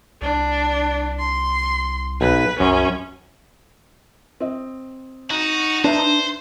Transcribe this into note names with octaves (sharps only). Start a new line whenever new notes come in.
C2 D4
C6
B1 B4
C2 F#2 C#4
C4 D#5
D#4 F#4
D4 B4 C5 E5 A5